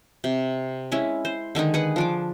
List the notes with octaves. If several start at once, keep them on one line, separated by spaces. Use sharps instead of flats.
C3
G#3 C#4 E4
C5
D3 D#3 G#3 D#4
G#4 B4 F#5
F3 D4 D6